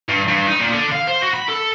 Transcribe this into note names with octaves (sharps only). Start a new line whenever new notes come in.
G2
G2
D#4
A#2
D3
F5
C5
F#4
B5
A4